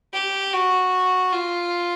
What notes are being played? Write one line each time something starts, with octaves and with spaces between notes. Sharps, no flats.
G4
F#4
F4